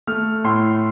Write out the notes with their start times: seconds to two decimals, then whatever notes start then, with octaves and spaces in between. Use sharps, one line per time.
0.07 A3 F6
0.44 A2 C6